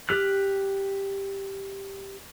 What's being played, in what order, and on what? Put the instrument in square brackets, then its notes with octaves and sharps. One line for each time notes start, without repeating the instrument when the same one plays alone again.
[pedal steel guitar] G4 F6 F#6